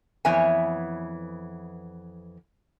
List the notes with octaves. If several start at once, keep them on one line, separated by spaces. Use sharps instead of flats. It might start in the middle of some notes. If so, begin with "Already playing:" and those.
F2 E3 B3 C#5 E5 G#5